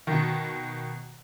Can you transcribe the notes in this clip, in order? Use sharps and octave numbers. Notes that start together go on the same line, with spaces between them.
B2 D#3